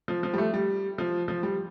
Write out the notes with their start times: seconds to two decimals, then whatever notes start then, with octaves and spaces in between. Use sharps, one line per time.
0.08 F3
0.23 F3
0.34 G3
0.38 A3
0.54 G3
0.98 F3
1.28 F3
1.43 G3